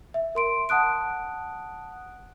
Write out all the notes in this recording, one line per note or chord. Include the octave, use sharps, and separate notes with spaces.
E5
A#4 C6 D7
F#5 A5 D#6 F#6 D7